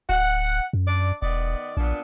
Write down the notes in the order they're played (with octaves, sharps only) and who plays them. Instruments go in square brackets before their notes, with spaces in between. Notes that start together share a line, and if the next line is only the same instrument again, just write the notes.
[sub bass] D1 [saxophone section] F#5
[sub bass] F#2
[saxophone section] D4 D5
[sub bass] E1 [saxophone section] D#3 B3 D5
[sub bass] A#1 [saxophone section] A#2 B3 D4